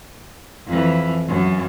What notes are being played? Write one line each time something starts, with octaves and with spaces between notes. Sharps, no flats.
F2 E3
F#2